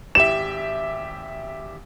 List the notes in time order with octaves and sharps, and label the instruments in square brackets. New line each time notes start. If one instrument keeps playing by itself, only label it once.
[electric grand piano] G#1 G4 E5 [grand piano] E7